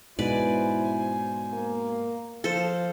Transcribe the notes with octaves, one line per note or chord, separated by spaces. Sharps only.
G#2 B2 E4 B4 C5 D5 G#5
A#3
F3 A4 C5 F5